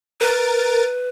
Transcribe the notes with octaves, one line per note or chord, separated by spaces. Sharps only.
A#4 B4 A6 D7